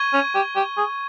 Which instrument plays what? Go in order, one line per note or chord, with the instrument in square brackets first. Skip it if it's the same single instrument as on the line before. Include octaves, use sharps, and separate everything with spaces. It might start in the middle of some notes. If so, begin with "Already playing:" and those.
Already playing: [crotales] C#6 G#6 D#7 G7
[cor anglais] C#4
G4
G4
G#4